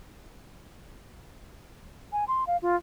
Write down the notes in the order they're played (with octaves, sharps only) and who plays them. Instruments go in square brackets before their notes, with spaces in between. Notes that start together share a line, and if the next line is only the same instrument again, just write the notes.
[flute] G#5
C6
F5
F4